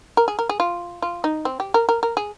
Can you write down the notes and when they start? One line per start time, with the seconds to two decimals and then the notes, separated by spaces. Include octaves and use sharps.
0.17 A#4
0.28 G#4
0.39 A#4
0.49 G#4
0.60 F4
1.02 F4
1.24 D#4
1.45 C4
1.60 G4
1.74 A#4
1.89 A#4
2.03 A#4
2.17 G#4